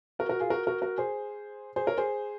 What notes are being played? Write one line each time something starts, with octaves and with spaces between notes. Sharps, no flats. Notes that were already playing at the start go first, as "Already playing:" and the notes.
F#4 A#4
F#4 A#4
F4 G#4
F#4 A#4
F#4 A#4
F#4 A#4
G#4 C5
G#4 C5
A#4 C#5
G#4 C5